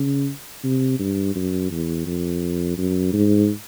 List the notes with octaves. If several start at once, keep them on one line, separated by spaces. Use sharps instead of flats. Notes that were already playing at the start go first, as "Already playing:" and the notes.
Already playing: C#3
C3
G2
F#2
E2
F2
F#2
G#2